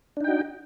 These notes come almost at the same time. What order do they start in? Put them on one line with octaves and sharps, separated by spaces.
D4 D#4 G5 F#4